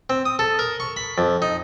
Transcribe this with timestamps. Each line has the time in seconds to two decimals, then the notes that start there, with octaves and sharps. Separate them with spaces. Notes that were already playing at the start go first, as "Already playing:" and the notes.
0.10 C4
0.25 D#6
0.39 A4
0.59 A#4
0.80 C#6
0.96 B5
1.18 F2
1.42 D#4